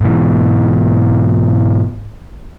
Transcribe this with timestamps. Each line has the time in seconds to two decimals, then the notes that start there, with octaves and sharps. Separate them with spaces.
0.01 G#2 B2 E3